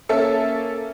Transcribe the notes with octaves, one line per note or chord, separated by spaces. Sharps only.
A#3 C#4 A4 E5